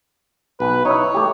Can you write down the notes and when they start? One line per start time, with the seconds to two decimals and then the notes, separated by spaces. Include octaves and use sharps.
0.60 B1 B4
0.85 D#4 E4 C#5
1.14 A3 G4